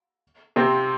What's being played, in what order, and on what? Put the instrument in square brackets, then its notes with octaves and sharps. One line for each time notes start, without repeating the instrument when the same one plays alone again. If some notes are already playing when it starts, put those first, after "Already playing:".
[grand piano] C3 C4